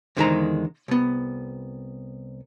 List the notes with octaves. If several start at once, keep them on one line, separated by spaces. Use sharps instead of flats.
E2 D3 D#3 G#3 C5 A#5
C2 B3